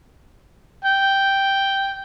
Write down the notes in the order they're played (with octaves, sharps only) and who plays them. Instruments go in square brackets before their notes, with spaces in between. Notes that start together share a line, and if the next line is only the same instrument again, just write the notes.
[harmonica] G5